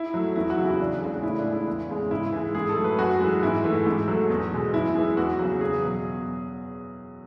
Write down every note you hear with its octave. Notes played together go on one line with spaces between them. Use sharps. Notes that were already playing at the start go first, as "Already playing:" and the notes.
Already playing: E4
F#3 A3
E2 E4
F#4
C#3 F#3
E4
E2 D4
C#3 G#3
A2 E4
D4
G#3
E4
E2
C#3 G#3
G#2 E4
E3 G#3
G#2 G#4
A4
F#3 A3
B4
F#2 F#4
E3 G#3
G#2 E4
E3 A3
G#2
F#3 A3
E2
B2 G#3
F#2 E4
E3 G#3
E2 F#4
C#3 F#3
E2 G#4
B2 F#3